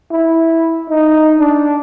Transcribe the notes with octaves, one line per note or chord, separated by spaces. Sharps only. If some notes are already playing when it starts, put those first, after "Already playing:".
E4
D#4
D4